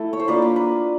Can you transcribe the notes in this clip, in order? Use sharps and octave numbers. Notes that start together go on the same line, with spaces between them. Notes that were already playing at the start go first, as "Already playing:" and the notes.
Already playing: A3 E4 A4
C#5
C5
A#3 D4 F4 B4
A#4
B4